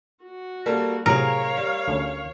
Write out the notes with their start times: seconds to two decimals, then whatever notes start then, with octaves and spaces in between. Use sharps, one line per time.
0.24 F#4
0.66 G3 A#3 A4
1.06 A2 C3 F#3 G#4 A#4 C#5 F5 D7
1.57 G3
1.88 D2 A3 C#4